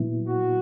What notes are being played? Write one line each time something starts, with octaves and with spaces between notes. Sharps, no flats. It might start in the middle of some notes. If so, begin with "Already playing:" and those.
Already playing: A#2 F#3 B3 E4
F#4